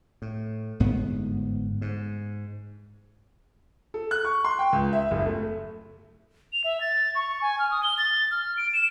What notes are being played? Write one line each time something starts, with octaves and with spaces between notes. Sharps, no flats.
A2
G1 G#2 B3
G#2
A4
F#6
C#6
C6
G5
C#2
E5
F#1
A3
F7
E5
A6
C#6
G#5
F6
D#6
G7
A6
F6
D7
E7